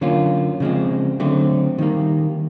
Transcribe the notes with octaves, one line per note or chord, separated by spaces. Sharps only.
D3 F#3 A#3 C#4 F4
C#3 F3 G#3 C4
D3 F#3 A3 C4
D#3 G3 A#3